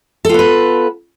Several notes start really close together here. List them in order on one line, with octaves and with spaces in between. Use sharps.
A4 F4 B3 B4